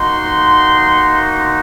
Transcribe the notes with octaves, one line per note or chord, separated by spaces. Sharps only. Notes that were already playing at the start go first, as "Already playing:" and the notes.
Already playing: A#3 D#4 F#4 C6